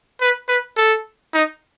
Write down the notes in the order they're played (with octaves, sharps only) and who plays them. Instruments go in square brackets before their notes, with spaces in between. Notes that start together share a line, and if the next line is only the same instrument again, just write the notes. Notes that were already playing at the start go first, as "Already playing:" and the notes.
[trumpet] B4
B4
A4
D#4